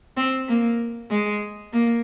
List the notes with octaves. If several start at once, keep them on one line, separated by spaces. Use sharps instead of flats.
C4
A#3
G#3
A#3